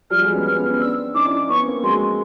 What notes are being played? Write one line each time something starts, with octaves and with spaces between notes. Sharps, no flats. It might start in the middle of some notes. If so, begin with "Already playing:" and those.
F3 G3 F6
F#3 G#3
B3 C#4
B3 C#4 F6
B3 C#4
B3 C#4
C4 D4 E6
C#4 D#4 D6
D4 E4
B3 C#4 C#6
A#3 C4
F#3 G#3 C6